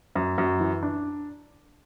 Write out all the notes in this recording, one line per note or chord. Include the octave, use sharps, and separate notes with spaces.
F#2
F#2
E3
D4